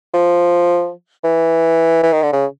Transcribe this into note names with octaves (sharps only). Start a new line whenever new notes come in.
F3
E3
E3
D#3
D3
C#3